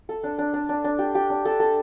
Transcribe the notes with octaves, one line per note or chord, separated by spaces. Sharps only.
A4
D4
D4
D4
D4
D4
G4
G4
D4
A4
A4